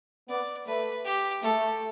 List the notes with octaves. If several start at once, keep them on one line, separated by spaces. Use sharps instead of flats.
B3 D5
A3 B4
G4
A3 A4